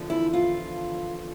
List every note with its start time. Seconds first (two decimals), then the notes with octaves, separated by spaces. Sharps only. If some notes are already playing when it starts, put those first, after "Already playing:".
Already playing: E2 D3 F3
0.10 E4
0.33 F4